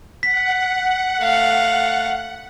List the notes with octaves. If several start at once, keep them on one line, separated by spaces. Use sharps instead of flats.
F#5 B6
A3 F5